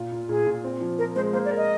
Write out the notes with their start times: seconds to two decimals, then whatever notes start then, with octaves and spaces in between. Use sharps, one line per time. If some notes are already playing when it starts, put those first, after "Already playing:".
Already playing: A#2 F4
0.12 A#2
0.29 A#2 G#4
0.47 A#2
0.64 C4
0.81 F3
0.98 F3 A#4
1.15 G#3 C5
1.33 A#3 C5
1.45 D5
1.51 A#4
1.57 D#5